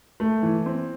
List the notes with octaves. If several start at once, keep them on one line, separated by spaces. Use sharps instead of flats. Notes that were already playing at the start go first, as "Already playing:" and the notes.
A3
E3
C4